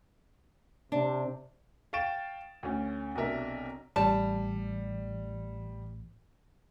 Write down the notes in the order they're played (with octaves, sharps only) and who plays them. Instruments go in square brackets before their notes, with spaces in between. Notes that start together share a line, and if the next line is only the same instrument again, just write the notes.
[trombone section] C3 [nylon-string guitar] D4
[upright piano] F5 G5 C#6 A6 D7 E7
D2 C#4
B1 C3 D4 A#4 E5
[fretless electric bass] A1 [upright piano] G3 [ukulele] A5